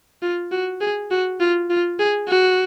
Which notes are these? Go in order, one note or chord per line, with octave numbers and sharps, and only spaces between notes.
F4
F#4
G#4
F#4
F4
F4
G#4
F#4